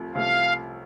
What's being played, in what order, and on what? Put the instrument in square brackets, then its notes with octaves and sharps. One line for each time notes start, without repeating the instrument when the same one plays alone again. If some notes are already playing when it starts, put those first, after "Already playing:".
Already playing: [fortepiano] C2 C3 F3 A3
[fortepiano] C2 C3 F3 A3 [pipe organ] F5